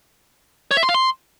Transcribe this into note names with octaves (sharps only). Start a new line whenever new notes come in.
C#5
E5
C6
F5
C6